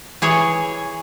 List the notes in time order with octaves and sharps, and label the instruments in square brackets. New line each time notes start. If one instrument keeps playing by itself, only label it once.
[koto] E3 G#4 C#5